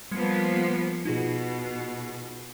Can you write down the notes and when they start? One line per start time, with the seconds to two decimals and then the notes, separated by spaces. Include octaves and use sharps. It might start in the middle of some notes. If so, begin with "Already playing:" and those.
0.11 F3 G3 A#3 B3 G#6 C#7
1.05 B2 D#4 F4 G#4